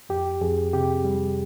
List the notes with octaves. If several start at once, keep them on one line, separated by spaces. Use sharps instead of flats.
F2 G4
F2 G#4
C3 G4
G3